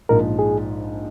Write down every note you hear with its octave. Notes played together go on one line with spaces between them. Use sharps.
A#1 G#2 F3 A#4
G#4